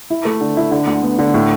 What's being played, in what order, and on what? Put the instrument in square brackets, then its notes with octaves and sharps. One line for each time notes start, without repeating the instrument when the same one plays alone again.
[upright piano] E4
A3
D3
E4
D3
D2
B3
D3
A2